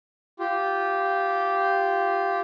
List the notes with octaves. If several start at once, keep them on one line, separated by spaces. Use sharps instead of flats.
F4 G4